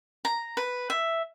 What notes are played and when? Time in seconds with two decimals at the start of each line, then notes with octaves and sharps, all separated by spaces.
0.25 A#5
0.57 B4
0.90 E5